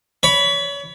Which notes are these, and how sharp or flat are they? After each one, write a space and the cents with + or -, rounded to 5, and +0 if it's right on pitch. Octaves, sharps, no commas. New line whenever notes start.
C#5 +30 B5 +0